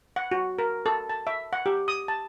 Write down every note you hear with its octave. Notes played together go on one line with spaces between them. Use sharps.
F#5
F#4
A#4
A4
A5
E5
F#5
G4
D#6
A5